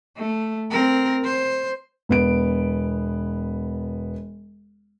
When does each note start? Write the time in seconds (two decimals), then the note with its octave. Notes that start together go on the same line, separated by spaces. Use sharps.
0.17 A3
0.71 C4 A#4
1.24 C5
2.09 E1 B3 D7